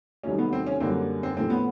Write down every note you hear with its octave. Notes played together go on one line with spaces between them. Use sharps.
C2 C3 D#3 F#3 A3 C#4
B3
C4
C#4
F#2 D3 G3 A#3 C4
C4
A2 F3 A3 C4
B3